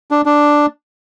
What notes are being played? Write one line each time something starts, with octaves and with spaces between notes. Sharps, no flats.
D4
D4